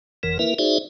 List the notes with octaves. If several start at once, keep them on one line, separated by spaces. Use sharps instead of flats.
F#1 F2 E3 A#4
A#3 E4 A#4 B4 E5
D#4 F#4 G#4 C5 D5 E5